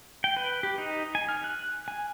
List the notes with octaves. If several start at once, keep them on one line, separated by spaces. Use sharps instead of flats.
G5
B4
G4
D#4
G#5
F6
F#6
G#5